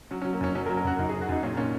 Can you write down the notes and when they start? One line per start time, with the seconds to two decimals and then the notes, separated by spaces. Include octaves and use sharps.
0.11 F#3 C#4
0.21 C#4
0.25 F#3
0.33 A#3
0.41 F#2 C#4
0.55 F#3 C#4
0.66 A#4
0.69 F#3
0.77 A#4
0.84 F#2 F#4
0.99 F#2 D#4
1.09 G#4
1.13 F#3
1.21 F#4
1.29 F#2 D#4
1.43 A#2 C#4
1.57 A#2 C#4